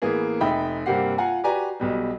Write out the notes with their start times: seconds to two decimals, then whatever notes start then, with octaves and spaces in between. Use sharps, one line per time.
0.02 A1 E3 A#3 B3 G#4
0.41 F1 D#4 E5 G5 B5
0.86 G2 C3 A#3 G4 F#5 C7
1.18 F4 F5 F#5 G#5 A#5
1.43 F#4 G4 B4 D5 G#5 A#5
1.80 B1 B2 G3